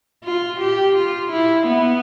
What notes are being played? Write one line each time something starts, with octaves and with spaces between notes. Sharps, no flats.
F4
G4
F4
E4
B3